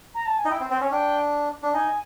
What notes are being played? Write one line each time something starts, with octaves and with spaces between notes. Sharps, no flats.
A#5
A5
G#5
D#4
E4 G5
C4
C4
C#4
D4 G5
D4
D#4 G#5